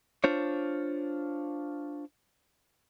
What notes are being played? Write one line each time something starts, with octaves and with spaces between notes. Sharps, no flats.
D4 F4 C5 C#5